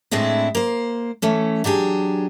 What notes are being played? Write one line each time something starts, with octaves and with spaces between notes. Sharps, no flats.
A2 G#3 C4 D4 E4
A#3 C5
E3 A3 C#4
F#3 D4 G4 G#4